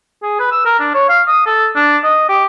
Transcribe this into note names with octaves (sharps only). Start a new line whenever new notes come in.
G#4
B4
E6
A#4
D4
C#5
F5
D#6
A4
D4
D#5
G4